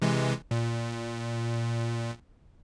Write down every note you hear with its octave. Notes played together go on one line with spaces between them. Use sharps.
C3 E3 G#3
A#2